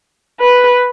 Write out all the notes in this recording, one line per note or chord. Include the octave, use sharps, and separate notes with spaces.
B4